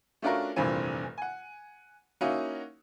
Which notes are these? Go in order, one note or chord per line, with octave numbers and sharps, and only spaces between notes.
A3 C#4 D4 F4 F#4 A#4
F1 G2 A#2 E3 C4 G#5
F#5 G#5
A#3 C#4 D#4 E4 F#4